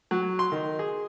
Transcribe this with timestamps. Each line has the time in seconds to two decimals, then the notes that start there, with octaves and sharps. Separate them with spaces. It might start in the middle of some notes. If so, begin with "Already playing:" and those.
0.11 F#3
0.39 C6
0.52 D#3
0.79 G#4